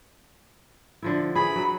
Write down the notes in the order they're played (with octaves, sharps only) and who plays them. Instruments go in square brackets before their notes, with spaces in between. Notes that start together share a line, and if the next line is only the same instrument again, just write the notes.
[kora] D3 F3 E4
[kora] E3 G#4 [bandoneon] B5
[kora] F#3